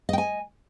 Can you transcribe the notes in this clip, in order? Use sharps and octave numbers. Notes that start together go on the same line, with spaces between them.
D#5 G5 G#5